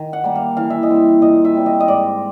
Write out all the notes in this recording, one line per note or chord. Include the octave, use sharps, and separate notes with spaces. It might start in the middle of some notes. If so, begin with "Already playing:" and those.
Already playing: D#3
F#5
G3 A#3
F5
E3 F5
E5
D#5
G3 C4
E5
A#2 D#5
E5
G3 C4
D#5
D#5
G#2 D5